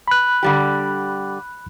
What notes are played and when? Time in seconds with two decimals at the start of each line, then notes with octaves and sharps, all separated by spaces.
0.08 B5 F#6
0.43 D3 G3 G4